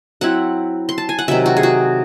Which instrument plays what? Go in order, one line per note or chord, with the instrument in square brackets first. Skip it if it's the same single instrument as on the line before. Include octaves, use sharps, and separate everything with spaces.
[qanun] F#3 C4 E4 F#5
C6
A5
G#5
F#5
C3 D#3 F#3 E5
F#4
G#4
F#4